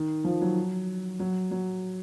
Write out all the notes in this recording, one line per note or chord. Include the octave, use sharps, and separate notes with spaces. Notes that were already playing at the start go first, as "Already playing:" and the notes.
Already playing: D#3
F3
F#3
F#3
F#3